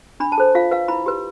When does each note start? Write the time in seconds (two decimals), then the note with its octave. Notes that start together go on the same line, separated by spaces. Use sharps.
0.20 D4 B5
0.32 A5
0.38 A4 C5
0.55 F4 F5
0.71 B4 F5
0.88 E4 B5
1.06 G4 B4